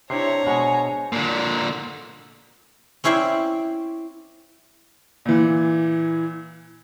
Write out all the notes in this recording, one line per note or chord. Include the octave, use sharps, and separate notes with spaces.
C3 D4 E4 C5 C#5 A#5 C7
B2 G#3 F#5 G#5
A#2 D3
C4 C#4 E4 C5 D5
A#2 E3